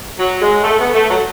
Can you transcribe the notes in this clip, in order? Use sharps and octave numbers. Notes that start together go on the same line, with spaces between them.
F#3
G#3
A3
B3
A3
F#3